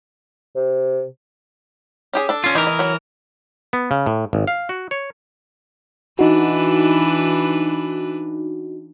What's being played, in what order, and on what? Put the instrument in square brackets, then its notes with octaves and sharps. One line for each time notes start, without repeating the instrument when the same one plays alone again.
[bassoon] C3
[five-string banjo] C#4 G4 G#4
D4 A4
[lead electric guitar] C#4 F4
[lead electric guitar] E3 A#4 [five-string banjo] D#4 G4
[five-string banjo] D#5
F#3 C#5
[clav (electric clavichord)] B3
C#3
A2
G#1
F5
F#4
C#5
[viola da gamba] E3 D4 B4 [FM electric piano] D#4 F#4